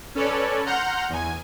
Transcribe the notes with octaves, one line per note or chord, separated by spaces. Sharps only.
C#4 A4 B4 C#5 D5
F#5 A#5 C6 F6 G6
E2 G#5